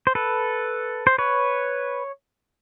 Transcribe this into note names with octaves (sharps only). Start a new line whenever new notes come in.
C5
A4 B4
C5
B4 C#5